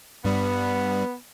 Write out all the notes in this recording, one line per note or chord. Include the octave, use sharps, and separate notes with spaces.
G2 G3 B3